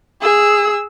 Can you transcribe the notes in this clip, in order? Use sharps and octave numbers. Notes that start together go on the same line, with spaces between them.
G#4 E6